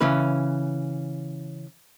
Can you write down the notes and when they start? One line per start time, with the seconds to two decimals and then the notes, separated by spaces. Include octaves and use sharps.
0.01 C#3 E3 C#4 B4